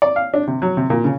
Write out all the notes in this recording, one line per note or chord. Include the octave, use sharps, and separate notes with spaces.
D5
F5
D4
C3
F#3
C3
A#2
C#3